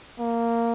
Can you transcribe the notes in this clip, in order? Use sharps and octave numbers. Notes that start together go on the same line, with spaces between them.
A#3